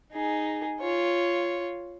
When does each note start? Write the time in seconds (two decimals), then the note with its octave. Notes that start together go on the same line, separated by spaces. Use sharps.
0.12 D#4 G#4
0.80 F4 C#5